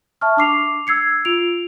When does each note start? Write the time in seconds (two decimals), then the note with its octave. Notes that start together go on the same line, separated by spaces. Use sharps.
0.21 E5 A5 C#6 F6
0.37 D4 D6 C7 F7
0.87 E6 G#6 C7 C#7
1.25 F4 D7 F7